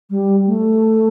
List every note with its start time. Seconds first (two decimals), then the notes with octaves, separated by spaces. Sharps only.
0.10 G3
0.47 A3